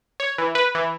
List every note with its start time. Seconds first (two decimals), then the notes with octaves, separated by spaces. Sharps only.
0.20 C#5
0.38 E3
0.55 B4
0.75 E3